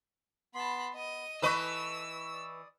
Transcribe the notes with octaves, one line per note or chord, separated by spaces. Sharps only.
B3 A5 B5 C6
B3 D#5 D#7
E3 A4 B4 D#5 B5 C#6 E6
D5 D#6